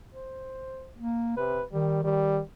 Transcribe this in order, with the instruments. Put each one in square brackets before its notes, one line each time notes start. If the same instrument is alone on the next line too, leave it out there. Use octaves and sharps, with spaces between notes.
[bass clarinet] C5
A#3
[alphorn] C3 [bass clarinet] B4
[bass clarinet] D#3 [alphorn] G3
[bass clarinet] D#3 [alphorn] G3